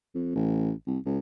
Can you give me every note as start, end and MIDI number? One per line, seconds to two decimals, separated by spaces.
0.15 0.33 41
0.35 0.72 33
0.87 0.98 36
1.06 1.18 37